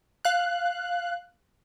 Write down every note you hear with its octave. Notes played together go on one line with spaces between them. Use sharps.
F5 F#6